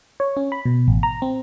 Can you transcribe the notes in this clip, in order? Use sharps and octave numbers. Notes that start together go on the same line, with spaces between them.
C#5
C#4
B5
B2
A1
A#5
C4